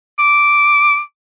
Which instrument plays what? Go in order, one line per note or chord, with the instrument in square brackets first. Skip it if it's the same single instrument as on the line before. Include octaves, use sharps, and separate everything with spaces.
[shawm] D6